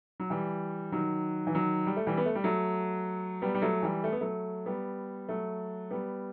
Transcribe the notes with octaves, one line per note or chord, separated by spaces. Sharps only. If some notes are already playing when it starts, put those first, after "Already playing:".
F#3
E3 G3
D#3 F#3
E3
D#3 F#3
G3
A3
E3 G3
B3
A3
G3
F#3 A3
G3 B3
G3
F#3 A3
E3 G3
A3
B3
F#3 A3
G3 B3
F#3 A3
G3 B3